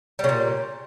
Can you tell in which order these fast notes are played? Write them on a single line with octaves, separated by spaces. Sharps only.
G3 C#3 A#2